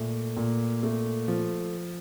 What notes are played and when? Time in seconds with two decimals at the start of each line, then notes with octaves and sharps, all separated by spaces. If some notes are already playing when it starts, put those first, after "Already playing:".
Already playing: A#2 A3
0.37 A#2
0.83 A3
1.28 F3